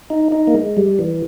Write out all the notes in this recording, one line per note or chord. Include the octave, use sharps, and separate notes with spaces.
D#4
D#4
A#3
G#3
G3
E3